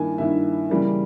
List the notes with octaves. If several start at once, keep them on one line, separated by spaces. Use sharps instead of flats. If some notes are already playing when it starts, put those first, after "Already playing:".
Already playing: G2 D#3 A#3 E4 G#5
G2 D#3 A#3 E4 E5
C#3 E3 G3 A#3